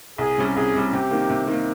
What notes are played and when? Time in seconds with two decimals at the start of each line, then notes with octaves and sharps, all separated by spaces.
0.18 C2 G#4
0.38 C3 G3 C#4
0.56 C2 G#4
0.74 C3 G3 C#4
0.93 C3 G4
1.11 D#3 A#3
1.30 C3
1.47 D#3 A#3